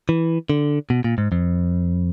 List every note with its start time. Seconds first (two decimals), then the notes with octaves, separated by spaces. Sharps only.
0.09 E3
0.50 D3
0.90 B2
1.04 A#2
1.18 G#2
1.32 F2